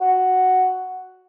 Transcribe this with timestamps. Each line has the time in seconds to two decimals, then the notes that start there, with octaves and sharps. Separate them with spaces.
0.01 F#4